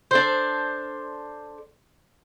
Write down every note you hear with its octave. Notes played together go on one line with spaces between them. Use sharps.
D4 A4 C5